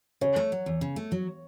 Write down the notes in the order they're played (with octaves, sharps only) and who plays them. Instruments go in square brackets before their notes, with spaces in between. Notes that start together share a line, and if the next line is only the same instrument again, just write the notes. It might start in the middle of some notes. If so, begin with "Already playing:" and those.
[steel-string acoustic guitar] C#3 [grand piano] C#5
[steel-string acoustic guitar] A3
F#3
E2
C#3
A3
F#3